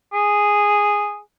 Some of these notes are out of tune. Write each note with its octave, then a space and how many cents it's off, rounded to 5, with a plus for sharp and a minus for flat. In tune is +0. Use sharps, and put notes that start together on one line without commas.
G#4 -5